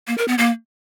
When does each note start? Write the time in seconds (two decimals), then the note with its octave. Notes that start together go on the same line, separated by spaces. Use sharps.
0.08 A#3
0.18 A#4
0.28 B3
0.38 A#3